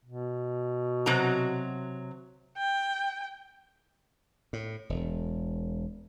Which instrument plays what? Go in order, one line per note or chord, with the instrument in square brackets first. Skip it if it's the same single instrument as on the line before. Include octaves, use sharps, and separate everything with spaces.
[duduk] B2
[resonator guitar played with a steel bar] C3 F#3 A#5
[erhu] G5
[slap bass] A2
E1